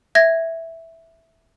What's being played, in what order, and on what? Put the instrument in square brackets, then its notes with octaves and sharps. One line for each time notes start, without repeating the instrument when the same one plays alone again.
[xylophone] E5 G#6 A#6